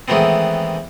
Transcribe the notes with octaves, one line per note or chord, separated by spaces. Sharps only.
D#3 E3 G#3 A3 B3 C4